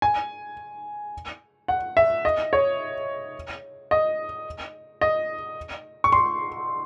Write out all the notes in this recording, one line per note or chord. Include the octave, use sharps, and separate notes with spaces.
G#5
F#5
E5
D#5
C#5
D#5
D#5
C#6
C6